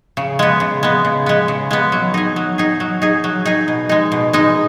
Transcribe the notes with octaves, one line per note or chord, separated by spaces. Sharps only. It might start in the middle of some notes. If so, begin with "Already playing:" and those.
C#3
G#3 B3
C#3
G#3 B3
C#3
G#3 B3
C#3
G#3 B3
F#3
D#4 G#4
F#3
D#4 G#4
F#3
D#4 G#4
F#3
D#4 G#4
B2
G#3 D#4
B2
G#3 D#4